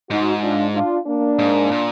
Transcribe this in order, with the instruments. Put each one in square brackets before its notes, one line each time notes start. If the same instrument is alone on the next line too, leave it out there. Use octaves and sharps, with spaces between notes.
[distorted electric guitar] G#2 [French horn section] D#4 F#4
[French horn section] D4 F4
D4 F4
A#3 D4
[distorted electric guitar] G#2
A#2